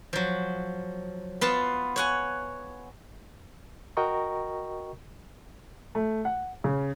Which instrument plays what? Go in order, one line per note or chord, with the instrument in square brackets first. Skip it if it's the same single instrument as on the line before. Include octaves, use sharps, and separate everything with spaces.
[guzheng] F3 F#3
B3 F4 A5
C#5 F#5 G#5
[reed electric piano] F#4 A#4 D#5 G5 A#5 C#6
[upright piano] A3
F#5
C#3